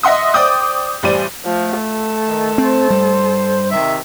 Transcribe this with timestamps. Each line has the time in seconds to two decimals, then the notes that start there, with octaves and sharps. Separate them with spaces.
0.03 D#5 E5 F#5 C6 D#6
0.34 C5 D5 G5 D6 D#6 G6
1.03 A1 G3 C5 D5 D#7
1.45 F3 A3
1.80 A4
2.28 D#3
2.58 C4 C5
2.90 G2 G3
3.71 C3 D#3 E5